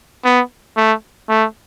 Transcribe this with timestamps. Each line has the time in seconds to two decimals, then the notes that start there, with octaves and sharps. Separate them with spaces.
0.25 B3
0.77 A3
1.29 A3